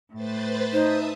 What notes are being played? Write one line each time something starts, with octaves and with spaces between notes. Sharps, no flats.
A2 B4 C5 A6
D#4 C5 E5 A5 D#6